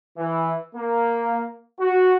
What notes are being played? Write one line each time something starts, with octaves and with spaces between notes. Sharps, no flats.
E3
A#3
F#4